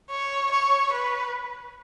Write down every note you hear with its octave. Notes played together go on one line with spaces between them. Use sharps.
C#5
C#5
B4